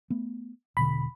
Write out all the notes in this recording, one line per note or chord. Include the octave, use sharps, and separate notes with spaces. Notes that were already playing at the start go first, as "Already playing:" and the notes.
A3 B3
E1 B2 D3 B5